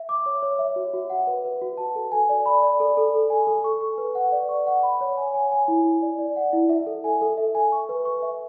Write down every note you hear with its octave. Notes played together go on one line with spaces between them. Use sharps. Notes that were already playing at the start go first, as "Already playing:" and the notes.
Already playing: E5
D6
C#5
C#5
E5
F#4
F#4
F#5
B4
B4
F#4
A5
A4
G#5
D5
B5
D5
A4
A4
A4
G#5
A4
C#6
C#6
B4
F#5
D5
C#6
F#5
B5
C#5
G#5
G#5
G#5
E4
E4
D5
D5
F#5
E4
E5
A4
G#5
A4
E5
G#5
C#6
B4
C#6
E5